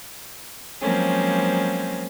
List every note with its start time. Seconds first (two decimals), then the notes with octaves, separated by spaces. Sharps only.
0.82 F3 F#3 G#3 A#3 C4 C#4